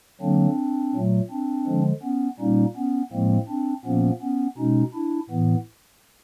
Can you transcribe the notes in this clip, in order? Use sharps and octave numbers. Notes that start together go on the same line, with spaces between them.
D3 F#3 A#3 C4 D4
A#2 F#3 A3
C4 D4
D3 F3 G#3
B3 C#4
A#2 G3 A#3 C#4 D#4
B3 C#4
A2 F3 G#3 A#3 C4
C4 D4
A#2 F3 A#3 B3 C#4
B3 C#4
B2 G#3 C#4 D#4
D4 E4
A2 E3 B3